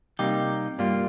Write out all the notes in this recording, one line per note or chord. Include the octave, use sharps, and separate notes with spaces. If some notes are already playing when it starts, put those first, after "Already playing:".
C3 G3 A#3 D#4 G4
G2 G3 A#3 F4